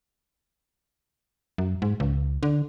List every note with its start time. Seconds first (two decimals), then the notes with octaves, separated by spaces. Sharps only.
1.58 F#2
1.82 G#2
2.00 C#2
2.43 D3